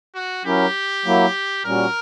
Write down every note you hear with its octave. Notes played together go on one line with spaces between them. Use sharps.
F#4
F#3 C#4 E4 G4 A#4
F#3 A#3 E4
A#2 G3 C#4 F#4 A#4